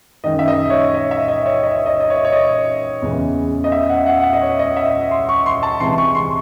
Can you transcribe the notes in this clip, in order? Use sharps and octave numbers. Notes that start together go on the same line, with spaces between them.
F#2 D#3 G#3 D#5
E5
D#5
C#5
D#5
E5
D#5
C#5
D#5
C#5
D#5
D#5
C#5
C#5
D#5
E2 C#3 E3 G#3
D#5
E5
F#5
F#5
F#5
E5
D#5
C#5
D#5
E5
C6
C#6
C6
A5
C3 E3 G#3 C6
C#6
C6